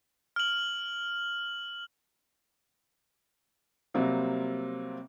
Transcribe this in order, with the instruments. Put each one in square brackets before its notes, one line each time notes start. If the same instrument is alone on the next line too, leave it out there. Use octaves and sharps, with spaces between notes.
[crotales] F6 F#7
[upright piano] C3 F#3 G3 A#3 C4